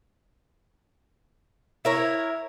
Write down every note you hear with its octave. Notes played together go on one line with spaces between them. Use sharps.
E4 A#4 C#5